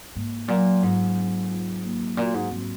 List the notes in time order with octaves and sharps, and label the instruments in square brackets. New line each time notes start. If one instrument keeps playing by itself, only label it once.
[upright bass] G#2 [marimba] A#3
[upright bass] A#2 [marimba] F#3
[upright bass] G#2 [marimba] F4
[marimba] C4
F4
A#3
[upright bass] A#2 [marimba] F#4
[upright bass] G#2
[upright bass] G#2 [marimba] C4